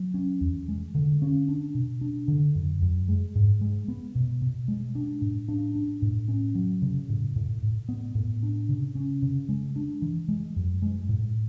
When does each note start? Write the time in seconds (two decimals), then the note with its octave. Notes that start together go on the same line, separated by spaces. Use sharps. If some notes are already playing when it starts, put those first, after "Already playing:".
Already playing: F#3
0.14 C#4
0.41 E2
0.68 G#3
0.95 D3
1.22 C#4
1.49 D4
1.75 B2
2.01 D4
2.28 D3
2.55 F#2
2.82 F#2
3.08 G#3
3.35 G#2
3.61 G#3
3.88 B3
4.15 B2
4.42 B2
4.68 G#3
4.95 D4
5.22 A2
5.48 D4
5.75 D4
6.02 A2
6.28 C#4
6.55 F#3
6.82 C#3
7.09 A2
7.36 A2
7.62 A2
7.89 B3
8.15 A2
8.43 D4
8.69 C#3
8.95 C#4
9.22 C#3
9.49 G#3
9.76 D4
10.02 E3
10.29 G#3
10.56 F#2
10.82 G#3
11.09 A2